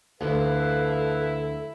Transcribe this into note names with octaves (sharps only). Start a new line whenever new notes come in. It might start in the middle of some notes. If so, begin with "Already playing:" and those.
D2 E4 A4 B4 F5